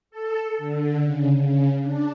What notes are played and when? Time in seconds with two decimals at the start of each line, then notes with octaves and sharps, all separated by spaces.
0.11 A4
0.58 D3
1.03 C#3
1.41 C#3
1.83 D4